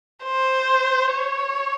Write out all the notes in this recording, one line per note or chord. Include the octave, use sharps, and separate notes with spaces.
C5
C#5